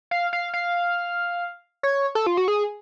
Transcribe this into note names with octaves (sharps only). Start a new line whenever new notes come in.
F5
F5
F5
C#5
A4
F4
F#4
G#4